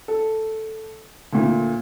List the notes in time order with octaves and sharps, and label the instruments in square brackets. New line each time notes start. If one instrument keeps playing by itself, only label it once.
[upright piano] A4
D2 A#2 D3